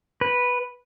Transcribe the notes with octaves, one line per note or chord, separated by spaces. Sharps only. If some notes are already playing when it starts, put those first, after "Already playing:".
B4